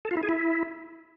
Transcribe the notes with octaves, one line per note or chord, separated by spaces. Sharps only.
A4
F4
E4
G#4
E4